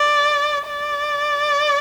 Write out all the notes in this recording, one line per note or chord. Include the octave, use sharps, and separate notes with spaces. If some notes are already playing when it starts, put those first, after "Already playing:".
Already playing: D5
D5